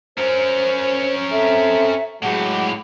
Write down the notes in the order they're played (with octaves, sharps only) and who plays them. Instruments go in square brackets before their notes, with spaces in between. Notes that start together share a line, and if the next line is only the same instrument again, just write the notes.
[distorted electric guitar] C#4 A#4 [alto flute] C5
[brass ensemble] C4 A4 [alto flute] E5
[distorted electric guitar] A2 G4 [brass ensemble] F#3 G#3 [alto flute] F#5